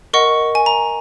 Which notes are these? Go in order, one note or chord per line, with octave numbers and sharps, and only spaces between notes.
A#4 D#5 F#5 C#6
G#5
A#5